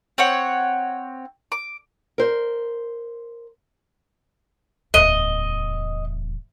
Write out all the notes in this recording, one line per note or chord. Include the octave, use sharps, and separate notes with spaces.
C4 C#5 F#5
D6
A#4 C5
D1 E2 D#5